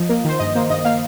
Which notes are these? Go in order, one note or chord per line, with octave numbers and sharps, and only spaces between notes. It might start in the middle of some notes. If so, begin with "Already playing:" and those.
Already playing: F3 D#5
A#3
D#3 C5
G2 D#5
A#3 C5
G2 D#5
A#3 F5